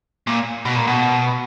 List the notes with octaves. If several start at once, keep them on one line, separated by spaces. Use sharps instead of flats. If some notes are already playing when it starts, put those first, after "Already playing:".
A#2
B2
A#2
B2